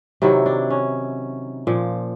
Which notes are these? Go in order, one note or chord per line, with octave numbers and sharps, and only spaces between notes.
C3 D#3 F#3 E4
D4
C#4
A#2 F3